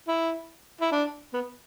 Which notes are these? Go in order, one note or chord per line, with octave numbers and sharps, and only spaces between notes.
E4
E4
D4
B3